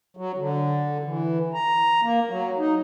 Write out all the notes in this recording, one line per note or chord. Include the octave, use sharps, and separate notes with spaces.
F#3
D3
E3
A#5
A#3
F#3
D#4